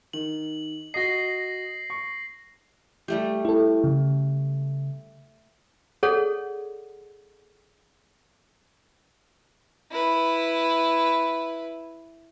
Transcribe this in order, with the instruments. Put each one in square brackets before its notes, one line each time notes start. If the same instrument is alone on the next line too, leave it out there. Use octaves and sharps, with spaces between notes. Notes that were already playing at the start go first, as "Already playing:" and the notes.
[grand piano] D#3 [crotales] F#7
[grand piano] F#4 D#5 [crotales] A#6 C7
[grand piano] C#6
[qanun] G3 A3 G4
[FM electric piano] E4 A4
C#3
[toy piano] G#4 A4 C#5 D5 F#5
[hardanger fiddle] E4 B4